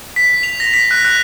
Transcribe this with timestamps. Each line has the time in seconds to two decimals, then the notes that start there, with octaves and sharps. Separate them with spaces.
0.16 B6
0.43 F7
0.60 A#6
0.74 B6
0.91 F#6
1.05 F#6